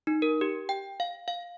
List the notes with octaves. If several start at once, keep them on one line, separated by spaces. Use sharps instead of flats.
D#4
A#4
G4
G5
F5
F5